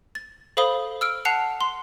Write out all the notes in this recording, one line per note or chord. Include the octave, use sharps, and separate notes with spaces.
A6
A4 C5 F5 B5 D#6 G7
E6 F6 D7
F#5 A5 F#6 C7 C#7 F7
C6